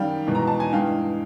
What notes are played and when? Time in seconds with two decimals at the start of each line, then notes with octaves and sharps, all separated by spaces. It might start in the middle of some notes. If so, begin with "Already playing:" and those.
Already playing: F#2 D#3 G3 F5 G5
0.27 E2 B2 G#3
0.35 A#5
0.47 A5
0.60 G#5
0.73 G2 E3 G#3 F5 G5